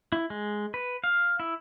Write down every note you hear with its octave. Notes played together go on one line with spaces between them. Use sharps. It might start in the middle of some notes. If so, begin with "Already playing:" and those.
E4
G#3
B4
F5
E4